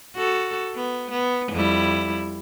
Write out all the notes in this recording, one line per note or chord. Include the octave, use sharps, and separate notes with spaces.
F#4 A4
B3
B3
F2 G3 E4